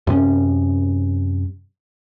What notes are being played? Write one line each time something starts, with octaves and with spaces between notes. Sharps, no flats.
F#2 C3 B3 C#4